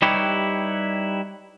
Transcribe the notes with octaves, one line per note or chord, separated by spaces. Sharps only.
G3 D#4 E4 G4 B4 C#5